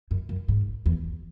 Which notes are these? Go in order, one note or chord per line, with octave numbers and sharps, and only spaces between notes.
F#2
F#2
G#2
E2